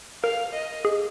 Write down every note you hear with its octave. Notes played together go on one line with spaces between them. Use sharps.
A#4 F5
D#5
G#4